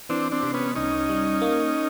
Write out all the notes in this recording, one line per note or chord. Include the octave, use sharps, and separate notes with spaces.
E3 C4 D4
C4 D4
C3
B3 C#4
C2 C#4 D#4
G3
A#3